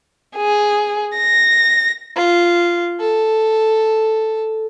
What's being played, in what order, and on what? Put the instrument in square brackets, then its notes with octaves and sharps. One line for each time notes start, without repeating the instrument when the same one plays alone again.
[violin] G#4
A#6
[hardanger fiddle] F4
A4